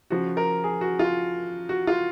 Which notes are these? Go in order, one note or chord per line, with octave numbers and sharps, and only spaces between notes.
C#3 F3 F#4
A#4
G#4
F#4
F4
F#4
F4